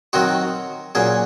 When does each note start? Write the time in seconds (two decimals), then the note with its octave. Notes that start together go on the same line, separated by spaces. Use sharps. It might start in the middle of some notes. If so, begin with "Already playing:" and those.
0.13 D#3 F#3 C4 D#4 F#4
0.95 A#2 F#3 C#4 G#4